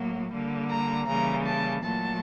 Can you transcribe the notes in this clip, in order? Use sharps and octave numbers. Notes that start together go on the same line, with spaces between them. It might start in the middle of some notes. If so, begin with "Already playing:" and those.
Already playing: A2 F#3 A#3
D3 G3 A#3
A#5
C#3 E3 G3 A#3 A#5
A5
A#2 F#3 A3 A5